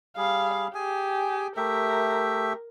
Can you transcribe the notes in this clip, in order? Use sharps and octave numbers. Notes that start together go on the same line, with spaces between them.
G3 G#4 F5
G4 G#4 G#5
A3 G4 A#4 E5